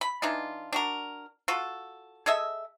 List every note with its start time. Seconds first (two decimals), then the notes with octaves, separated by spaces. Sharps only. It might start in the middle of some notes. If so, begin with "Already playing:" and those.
0.01 B5
0.22 E3 D4 D#4 F4
0.73 D4 F#4 A#4
1.48 F4 F#4 A4
2.26 G#4 A4 D#5 E5